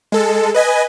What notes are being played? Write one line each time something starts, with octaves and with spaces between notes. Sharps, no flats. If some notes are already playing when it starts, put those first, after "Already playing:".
G#3 A4
B4 D#5 G#5